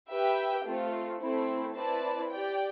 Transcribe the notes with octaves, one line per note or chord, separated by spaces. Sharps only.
G4 B4 E5 G5
A3 C4 F4
A3 C4 E4
C4 E4 B4 D5 A5
G4 D5 G5